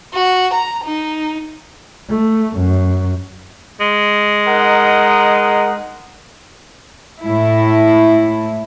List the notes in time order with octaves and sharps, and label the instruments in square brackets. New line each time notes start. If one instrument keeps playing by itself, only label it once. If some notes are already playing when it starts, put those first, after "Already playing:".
[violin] F#4
A#5
D#4
[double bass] A3
F#2
[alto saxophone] G#3
[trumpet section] D#4 A#4 F#5
[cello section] A2 E4